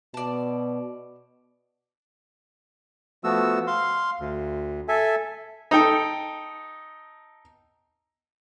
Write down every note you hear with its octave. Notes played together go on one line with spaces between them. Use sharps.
B2 D5 A5
F3 A3 B3 F#4 E6
F5 C6
D2
A4 E5 G#5
D#4 A4 G5